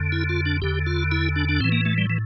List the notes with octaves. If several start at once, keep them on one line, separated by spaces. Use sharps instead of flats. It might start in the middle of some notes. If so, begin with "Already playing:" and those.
Already playing: F2 D3
E4
F4
D4
E2 D3 G4
F4
E4
D4
D4
A2 E3 C4
A#3
A3
G3
E3